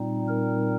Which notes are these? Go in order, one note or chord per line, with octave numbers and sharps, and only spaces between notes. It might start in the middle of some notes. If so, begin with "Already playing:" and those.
Already playing: A#2 G3 C4 D#4
A#4